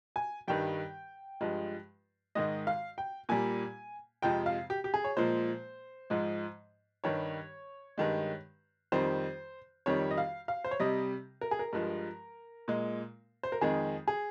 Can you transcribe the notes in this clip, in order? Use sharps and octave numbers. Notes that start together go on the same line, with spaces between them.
G#5
G2 D#3 G3 G5
G2 F3 G#3
G#2 D#3 G#3 D#5
F5
G5
A#2 G3 G#5
F2 C3 F3 G#3 G5
F5
G4
G4
G#4
C#5
A#2 F3 G#3 C5
G#2 F3 G#3
G2 D#3 G3 C#5
G2 D#3 G#3
F2 D#3 G3 C5
F2 D#3 G3 C#5
D#5
F5
F5
C5
C#5
C3 G3 D#5
A#4
G#4
A#4
G2 F3 G#3
A#2 G#3
C5
A#4
F2 D#3 G#3 G#4
G#4